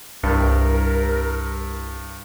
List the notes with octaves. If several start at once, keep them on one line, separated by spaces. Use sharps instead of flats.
C2 G2 A#4